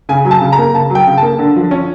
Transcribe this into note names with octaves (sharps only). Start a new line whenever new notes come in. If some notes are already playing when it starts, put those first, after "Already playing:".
C#3 G#5
F#3
A5
C#3
A#5
A#3
C#3 A5
F#3
G5
C#3
A#3 A5
D3
F3
C#4